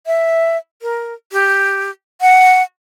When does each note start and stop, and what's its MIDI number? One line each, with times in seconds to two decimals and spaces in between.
0.07 0.57 76
0.82 1.14 70
1.32 1.90 67
2.21 2.62 78